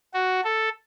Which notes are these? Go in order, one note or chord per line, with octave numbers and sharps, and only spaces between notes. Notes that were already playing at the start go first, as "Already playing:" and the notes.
F#4
A4